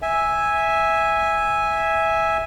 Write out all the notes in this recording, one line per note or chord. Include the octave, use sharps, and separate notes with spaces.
E5 G#5